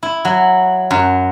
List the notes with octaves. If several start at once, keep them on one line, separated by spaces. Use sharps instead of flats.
E4
F#3
F#2